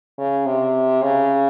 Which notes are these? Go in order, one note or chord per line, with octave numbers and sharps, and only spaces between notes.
C#3
C3
C#3